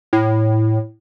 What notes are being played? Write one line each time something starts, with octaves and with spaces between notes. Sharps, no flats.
A2